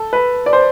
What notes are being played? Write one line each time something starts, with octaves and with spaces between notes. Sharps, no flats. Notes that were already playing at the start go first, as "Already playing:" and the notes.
Already playing: A4
B4
D5
C5